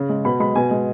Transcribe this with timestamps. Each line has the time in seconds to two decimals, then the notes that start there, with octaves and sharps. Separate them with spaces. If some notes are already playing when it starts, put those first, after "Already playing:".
Already playing: C#3
0.09 G#3
0.25 B2 B5
0.40 G#3 B5
0.55 B2 G#5
0.71 G#3